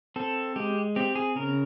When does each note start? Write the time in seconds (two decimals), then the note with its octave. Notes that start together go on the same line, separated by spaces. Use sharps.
0.16 C4 A4
0.56 G#3 G4
0.96 C4 G4
1.15 G#4
1.36 C#3 A#4